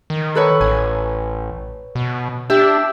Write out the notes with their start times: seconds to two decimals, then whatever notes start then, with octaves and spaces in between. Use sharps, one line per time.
0.10 D#3
0.35 A4 B4 C#5
0.61 A1 G#5
1.95 B2
2.50 D4 G4 E5